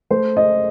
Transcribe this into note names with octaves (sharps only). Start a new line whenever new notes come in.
A3 C5
D#5